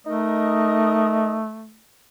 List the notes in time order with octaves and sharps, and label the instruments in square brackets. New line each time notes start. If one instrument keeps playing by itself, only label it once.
[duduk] A3 [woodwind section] D#4 A#4 D#5